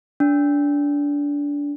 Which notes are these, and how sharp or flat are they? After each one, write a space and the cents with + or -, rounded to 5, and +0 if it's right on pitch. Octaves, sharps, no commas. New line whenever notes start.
D4 -25